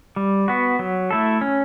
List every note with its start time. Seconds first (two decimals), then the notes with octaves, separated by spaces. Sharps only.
0.16 G3
0.48 B3 F#4
0.79 F#3
1.11 A3 E4 A4
1.41 C#4